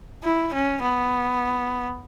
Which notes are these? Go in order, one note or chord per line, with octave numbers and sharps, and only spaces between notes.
E4
C#4
B3